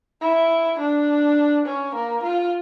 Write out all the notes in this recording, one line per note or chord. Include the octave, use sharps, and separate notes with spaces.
E4
D4
C#4
A#3
F4